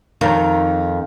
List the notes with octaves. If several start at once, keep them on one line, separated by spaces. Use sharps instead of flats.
F2 D#3